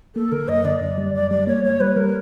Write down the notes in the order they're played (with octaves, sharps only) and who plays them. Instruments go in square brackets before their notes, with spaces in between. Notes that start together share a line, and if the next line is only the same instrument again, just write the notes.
[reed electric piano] A#3 [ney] A4
[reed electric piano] D3 [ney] A#4
[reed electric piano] F#2 [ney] D#5
[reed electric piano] D3 [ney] D5
[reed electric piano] F#2
G3
[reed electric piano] F#2 [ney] D5
[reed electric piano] G3 [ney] D5
[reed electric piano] A#3 [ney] C#5
[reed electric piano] A#3 [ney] C#5
[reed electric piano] G3 [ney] B4
[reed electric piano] G3 [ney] A#4